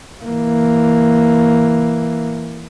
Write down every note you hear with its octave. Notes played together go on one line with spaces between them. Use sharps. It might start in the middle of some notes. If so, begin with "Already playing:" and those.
E3 A#3